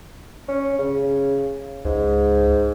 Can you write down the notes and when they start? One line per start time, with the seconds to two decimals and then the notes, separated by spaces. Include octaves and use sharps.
0.48 C#4
0.79 C#3
1.85 C#2 G#2